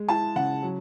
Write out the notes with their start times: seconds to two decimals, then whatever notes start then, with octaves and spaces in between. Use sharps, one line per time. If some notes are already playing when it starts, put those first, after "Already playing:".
Already playing: G#3
0.09 E4 A5
0.36 C#3 F#5
0.62 F#3